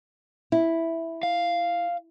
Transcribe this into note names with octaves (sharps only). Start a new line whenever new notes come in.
E4
F5